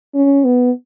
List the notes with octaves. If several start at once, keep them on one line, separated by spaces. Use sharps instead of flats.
C#4
B3